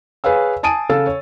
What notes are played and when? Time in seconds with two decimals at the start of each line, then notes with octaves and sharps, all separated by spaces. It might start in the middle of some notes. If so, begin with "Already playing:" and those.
0.24 G#4 B4 C#5 F5 E6
0.63 G#5 A5 D#6 D7 D#7
0.89 C#3 A4 F5 E6 A6
1.07 C#5